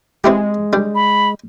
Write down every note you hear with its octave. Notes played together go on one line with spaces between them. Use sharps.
G#3 C4 E4 G4
G3 D4
B5